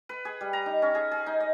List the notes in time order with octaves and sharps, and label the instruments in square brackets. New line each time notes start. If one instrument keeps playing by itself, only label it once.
[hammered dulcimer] B4
G#4
G3
A#5
D#4
C#4
G#4
G#4
D#4
D#5